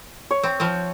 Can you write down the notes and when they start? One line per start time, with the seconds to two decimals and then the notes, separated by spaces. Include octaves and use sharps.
0.31 C#5
0.43 C4
0.60 F3 C4